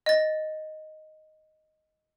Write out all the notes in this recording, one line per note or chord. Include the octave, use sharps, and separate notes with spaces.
D#5 A6